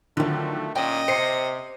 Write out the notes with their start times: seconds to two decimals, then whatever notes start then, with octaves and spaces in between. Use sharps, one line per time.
0.17 D3 D#3 F3 F#3 A3
0.76 A#2 C#4 D#5 G5
1.08 C3 C5 C7 C#7